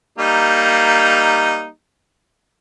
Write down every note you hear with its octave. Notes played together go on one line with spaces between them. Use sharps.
G3 A#3 D#4